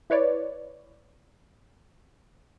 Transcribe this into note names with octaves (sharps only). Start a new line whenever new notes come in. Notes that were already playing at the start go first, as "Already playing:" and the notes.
E4 B4 C#5 D5